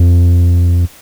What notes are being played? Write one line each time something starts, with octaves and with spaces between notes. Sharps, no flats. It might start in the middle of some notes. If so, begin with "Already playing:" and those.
Already playing: F2